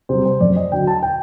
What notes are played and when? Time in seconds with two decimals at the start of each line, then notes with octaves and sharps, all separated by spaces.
0.09 C3 G3 C5
0.25 C5
0.40 F#2 D5
0.56 D#5
0.72 D3 F#3 G5
0.87 A5
1.03 G5